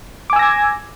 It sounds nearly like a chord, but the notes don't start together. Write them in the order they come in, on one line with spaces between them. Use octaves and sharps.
D6 G#5 E6 A#6 G#6